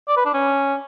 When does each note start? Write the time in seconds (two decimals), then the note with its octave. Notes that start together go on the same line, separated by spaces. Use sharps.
0.08 D5
0.17 B4
0.25 D4
0.34 C#4